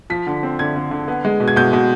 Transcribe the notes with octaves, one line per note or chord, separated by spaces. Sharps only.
F3 B6
D3
C4
D3 G#6
D3
D3
B3
G#3
B2
G#6
B2 G6
B2